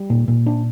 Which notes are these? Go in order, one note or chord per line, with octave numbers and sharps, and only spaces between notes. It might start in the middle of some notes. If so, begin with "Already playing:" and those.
Already playing: G3
A#2
A#2
D4